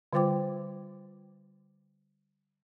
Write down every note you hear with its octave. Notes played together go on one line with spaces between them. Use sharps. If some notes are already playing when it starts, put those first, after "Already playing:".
D3 G3 F4 C5 G5 D6